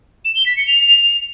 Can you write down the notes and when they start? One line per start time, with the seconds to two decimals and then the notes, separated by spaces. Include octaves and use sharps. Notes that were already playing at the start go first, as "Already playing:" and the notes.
0.25 E7
0.36 G7
0.46 B6
0.57 C#7
0.67 F7